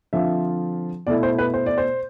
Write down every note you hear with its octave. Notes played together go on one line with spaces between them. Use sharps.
D3 F3 C4 F4 E5
B2 A3 E4 D5
C5
B4
C5
D5
C5